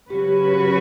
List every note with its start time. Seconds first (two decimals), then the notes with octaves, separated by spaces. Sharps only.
0.10 C#3 F#3 C#4 F#4 G4 B4